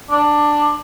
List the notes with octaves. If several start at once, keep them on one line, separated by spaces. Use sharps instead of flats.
D4